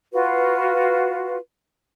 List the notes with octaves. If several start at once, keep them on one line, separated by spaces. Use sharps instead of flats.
F4 F#4 B4